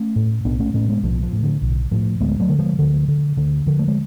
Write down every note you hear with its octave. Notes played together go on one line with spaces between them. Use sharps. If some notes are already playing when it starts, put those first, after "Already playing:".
Already playing: A3 C#4
A2
B1 B3 D4
A3 C#4
A2 A3 C#4
G#3 B3
B1 F3
F3
A2
D3
B1
A2 F3
D2 G#3 B3
F#3 A3
D3
F3 G#3
D2 D3
D3
D2 D3
D3 F3
A3
G#3